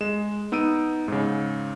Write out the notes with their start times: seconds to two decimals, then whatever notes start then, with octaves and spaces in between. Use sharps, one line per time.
0.01 G#3 E7
0.52 B3 D#4 E6 D7 D#7
1.08 G#2 C#3